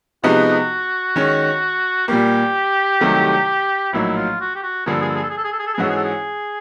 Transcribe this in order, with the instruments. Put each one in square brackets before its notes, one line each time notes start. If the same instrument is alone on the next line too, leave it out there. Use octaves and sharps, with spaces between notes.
[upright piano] C3 F3 G#3 B3 D#4 [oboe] F#4
[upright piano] D#3 G#3 C#4
[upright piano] A#2 G3 A#3 [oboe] G4
[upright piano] C2 C3 D#3 F#3 A3
[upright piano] A#1 A2 F#3 A#3 D#4 [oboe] E4
[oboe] F4
F#4
G4
F#4
[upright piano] G2 D3 F3 A#3 [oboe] G#4
[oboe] A4
G#4
A4
G#4
A4
G#4
A4
G#4
A4
G#4
A4
G#4
[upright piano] G#2 E3 G#3 C#4 F#4 [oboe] A4
[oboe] G#4
A4
G#4